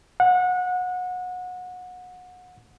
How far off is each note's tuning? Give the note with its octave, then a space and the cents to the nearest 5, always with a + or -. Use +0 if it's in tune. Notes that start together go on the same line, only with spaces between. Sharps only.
F#5 -25